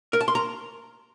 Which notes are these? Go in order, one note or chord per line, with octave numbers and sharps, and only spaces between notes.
A#4
A5
C6
A#5